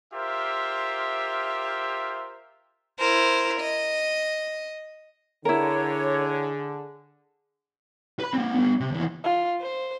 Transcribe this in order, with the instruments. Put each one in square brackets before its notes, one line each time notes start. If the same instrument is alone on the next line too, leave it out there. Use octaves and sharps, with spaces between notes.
[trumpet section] F4 G4 A#4 C5 E5
[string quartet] E4 A#4 C5
D#5
[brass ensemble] D3 [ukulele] E4 A#4 [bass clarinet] G#4 [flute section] C#5
[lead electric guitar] B4 B5
A#3 C4
G3 B3
C3
D#2 E3
[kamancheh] F4
C5